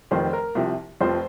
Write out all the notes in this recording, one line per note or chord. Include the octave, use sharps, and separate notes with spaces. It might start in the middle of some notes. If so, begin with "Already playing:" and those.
F1 F2 D#3 C5
A#4
C2 C3 F3
F1 F2 F3 C5